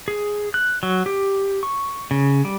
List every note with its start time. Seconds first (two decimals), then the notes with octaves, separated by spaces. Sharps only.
0.08 G#4
0.54 F#6
0.83 F#3
1.06 G4
1.63 C#6
2.11 C#3
2.45 G3